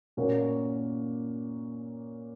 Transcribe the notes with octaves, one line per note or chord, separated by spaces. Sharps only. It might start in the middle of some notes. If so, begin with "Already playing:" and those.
A#2 A#3 C#4 F#4